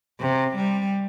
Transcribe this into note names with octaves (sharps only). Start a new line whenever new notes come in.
C3
G3